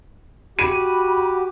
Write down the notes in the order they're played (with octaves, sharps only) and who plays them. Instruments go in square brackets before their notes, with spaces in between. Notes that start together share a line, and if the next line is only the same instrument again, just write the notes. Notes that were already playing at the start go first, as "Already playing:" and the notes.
[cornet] F#4 [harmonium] G4 [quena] B5 [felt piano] D#7